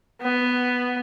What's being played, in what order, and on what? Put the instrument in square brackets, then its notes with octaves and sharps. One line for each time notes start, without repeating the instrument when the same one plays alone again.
[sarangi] B3